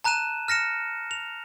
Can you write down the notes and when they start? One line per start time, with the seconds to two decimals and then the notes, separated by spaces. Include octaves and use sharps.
0.04 A5 A#5 F#6 D#7 E7
0.48 F6 A#6 C#7 E7
1.11 F7